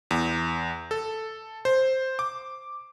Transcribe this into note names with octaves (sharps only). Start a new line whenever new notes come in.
E2
A4
C5
D6